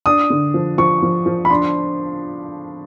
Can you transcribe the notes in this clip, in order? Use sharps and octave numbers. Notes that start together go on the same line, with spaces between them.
D4 D#6
D3
F3
F3 C#6
F3
F3
B5
D4 C6